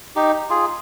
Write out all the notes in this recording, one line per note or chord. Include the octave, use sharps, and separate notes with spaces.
D#4 G4
F4 G#4